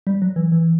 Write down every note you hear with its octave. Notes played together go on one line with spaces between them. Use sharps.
G3
F#3
E3
E3